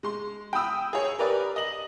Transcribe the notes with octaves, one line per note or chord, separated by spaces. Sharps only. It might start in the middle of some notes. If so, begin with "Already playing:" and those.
G#3 C6
G5 B5 D#6 E6
G#4 C#5
G4 A#4 B4 D5
D#5 F#7